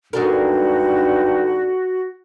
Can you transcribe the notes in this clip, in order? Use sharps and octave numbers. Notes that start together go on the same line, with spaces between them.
G2 D3 G#3 D#4 F#4 A4 A#4